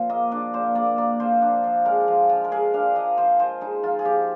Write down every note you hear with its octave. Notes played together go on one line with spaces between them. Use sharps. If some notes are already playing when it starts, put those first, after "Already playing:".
Already playing: A#2 F3 C5
A#3 D#5
D4 D5
A#2 C5
A#3 D5
A#3 D5
F3 C5
D4
F3
G#3 A#4
F3
F3
A#4
G#3 G#4
D4 F5
F3 D#5
F3 C5
F3 C5
G#3 D#4
F3 F4
G#4
F3 G4